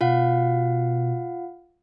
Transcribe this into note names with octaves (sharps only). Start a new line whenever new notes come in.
B2 F4 F5 F#5